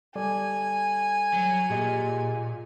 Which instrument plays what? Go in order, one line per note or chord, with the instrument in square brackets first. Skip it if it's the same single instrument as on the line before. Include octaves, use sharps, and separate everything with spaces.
[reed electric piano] G3 A4 D5 [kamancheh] G#5
[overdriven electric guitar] F#3
[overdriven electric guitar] A#2 [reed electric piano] G4 G#4 D#5